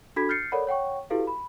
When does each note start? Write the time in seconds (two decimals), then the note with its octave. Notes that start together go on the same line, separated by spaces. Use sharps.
0.16 D4 F#4 A4 B5 G#6 B6
0.29 F6 G6 A6 C7 C#7
0.52 A4 A#4 C#5 D5 F#5 B5
0.67 C#5 F#5 G5 C#6
1.10 E4 F#4 G4 A4 B4 F5
1.27 B5